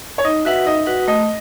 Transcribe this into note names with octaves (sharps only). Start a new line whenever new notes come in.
C#5
D#4 D#5
F#4 B4 E5 F#5
D#4 D#5
F#4 B4 F#5
A3 D#5